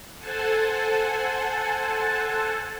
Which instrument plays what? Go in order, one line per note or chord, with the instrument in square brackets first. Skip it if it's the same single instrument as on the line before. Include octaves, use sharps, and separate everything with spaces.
[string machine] A4 C5 F#5 G#5 A5